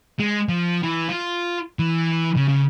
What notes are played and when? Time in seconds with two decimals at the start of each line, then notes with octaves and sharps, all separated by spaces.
0.19 G#3
0.48 F3
0.83 E3
1.09 F4
1.79 E3
2.36 C#3
2.49 C#3